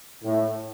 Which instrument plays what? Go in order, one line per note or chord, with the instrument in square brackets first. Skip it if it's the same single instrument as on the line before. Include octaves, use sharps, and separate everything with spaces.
[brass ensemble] A2